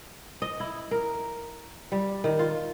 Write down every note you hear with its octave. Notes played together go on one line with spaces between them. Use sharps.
D#5
E4
A#4
G3
D#3
F4